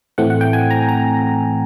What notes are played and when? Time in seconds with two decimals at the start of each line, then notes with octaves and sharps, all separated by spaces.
0.18 A2 E3 A3 C4 F#5
0.30 F#5
0.41 G5
0.53 G#5
0.71 A#5
0.88 A#5